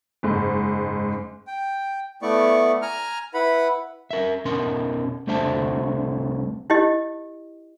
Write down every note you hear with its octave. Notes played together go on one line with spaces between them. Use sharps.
F#1 G#2
G5
A3 B3 E4 D5 C#6
G#5 A#5 F6
E4 B4 F#5 B5
A#4 E5
B2 C#4 A#4 C6
C2 A3 D4 C5 E5 A5
E4 G4 D#5